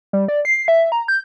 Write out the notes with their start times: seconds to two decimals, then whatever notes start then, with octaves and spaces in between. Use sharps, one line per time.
0.13 G3
0.28 D5
0.45 C7
0.68 E5
0.92 A#5
1.08 G6